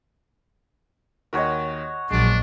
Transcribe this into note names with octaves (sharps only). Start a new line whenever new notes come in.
D#2 F#4 A#4 C#5 D#5
A#1 F#3 G#3 D4